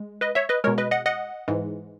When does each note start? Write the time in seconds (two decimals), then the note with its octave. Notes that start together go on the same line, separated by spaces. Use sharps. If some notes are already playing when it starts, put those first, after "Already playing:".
Already playing: G#3
0.21 B4 D#5
0.35 C#5 E5
0.49 B4 D#5
0.64 B2 G#3 A#4 C#5
0.78 B4 D#5
0.91 D#5 F#5
1.06 D#5 F#5
1.48 G#2 E3 G#3